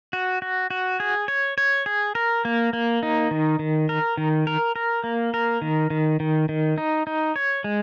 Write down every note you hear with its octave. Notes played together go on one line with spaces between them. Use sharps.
F#4
F#4
F#4
G#4
C#5
C#5
G#4
A#4
A#3
A#3
D#4
D#3
D#3
A#4
D#3
A#4
A#4
A#3
A#4
D#3
D#3
D#3
D#3
D#4
D#4
C#5
G#3